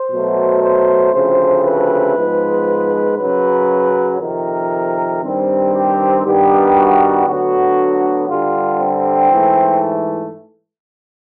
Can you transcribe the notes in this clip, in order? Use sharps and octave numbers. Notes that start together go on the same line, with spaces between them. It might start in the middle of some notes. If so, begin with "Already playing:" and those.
Already playing: C5
B2 F#3 A3
C5
D2 C#3 F3 A3 C4 C5
B4
G#2 F3 G#3 B3
F#2 C#3 F#3 B4
F2 C3 D#3 A#4
G2 D#3 G3 C4
G4
G2 D#3 G3 B3 G4
F#4
D2 D3 F#3 B3 F#4
G2 D3 G3 F4
C4
G#2 E3 A3